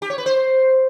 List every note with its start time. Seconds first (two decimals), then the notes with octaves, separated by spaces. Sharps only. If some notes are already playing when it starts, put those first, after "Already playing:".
0.02 G4
0.10 C#5
0.18 B4
0.26 C5